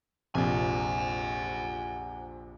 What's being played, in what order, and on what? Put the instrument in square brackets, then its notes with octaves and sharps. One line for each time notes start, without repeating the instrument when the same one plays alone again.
[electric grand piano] A#1 F2 C3 [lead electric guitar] F#5 G#5